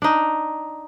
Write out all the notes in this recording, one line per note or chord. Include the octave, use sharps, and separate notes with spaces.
D4 D#4